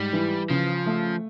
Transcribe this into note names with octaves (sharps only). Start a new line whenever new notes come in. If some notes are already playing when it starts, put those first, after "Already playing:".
Already playing: G#2 G3
E3
C#3 F3
A3